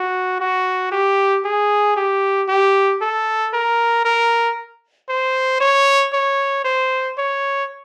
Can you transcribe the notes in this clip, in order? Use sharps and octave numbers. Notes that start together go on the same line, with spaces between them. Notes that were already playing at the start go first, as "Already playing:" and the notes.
Already playing: F#4
F#4
G4
G#4
G4
G4
A4
A#4
A#4
C5
C#5
C#5
C5
C#5